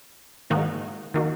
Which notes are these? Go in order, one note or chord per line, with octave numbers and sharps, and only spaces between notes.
G#2 D#3 A#3 D#4 F#4
D#3 A#3 D#4 F#4